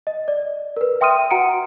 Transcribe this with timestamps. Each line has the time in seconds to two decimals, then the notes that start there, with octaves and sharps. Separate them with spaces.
0.07 D#5
0.28 D5
0.76 A#4 B4
1.01 E5 G5 C6 D#6 F6 D#7
1.30 F#4 F#5 A#5 C#7 D7